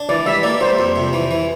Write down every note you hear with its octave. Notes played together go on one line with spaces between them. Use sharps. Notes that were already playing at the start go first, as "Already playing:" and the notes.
Already playing: D4
E3 D5
G3 E5
A#3 D5
G3 C5
F2
C3
E3
E3